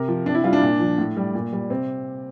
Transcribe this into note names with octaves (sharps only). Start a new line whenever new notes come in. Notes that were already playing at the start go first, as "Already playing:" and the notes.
Already playing: C3 A#4
F3
C3 D4
E4
G3 F4
D4
A#2
F3
A2
G3
A#2
G3
C3 C4